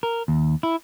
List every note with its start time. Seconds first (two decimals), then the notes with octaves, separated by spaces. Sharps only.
0.03 A#4
0.28 D#2
0.63 E4